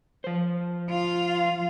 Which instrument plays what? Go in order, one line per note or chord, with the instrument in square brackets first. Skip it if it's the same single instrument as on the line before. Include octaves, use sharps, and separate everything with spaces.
[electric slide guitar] F3 C5
[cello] F4 F5